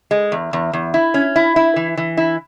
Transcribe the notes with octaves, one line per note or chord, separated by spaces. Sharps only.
G#3
E2
E2
E2
E4
C#4
E4
E4
E3
E3
E4